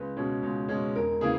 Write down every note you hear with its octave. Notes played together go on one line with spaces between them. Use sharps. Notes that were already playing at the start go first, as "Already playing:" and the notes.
Already playing: C#2 B4
B2 G#3 C#4
C#2
B2 G#3 C#4
E1 A#4
C#3 E3 A#3 G#4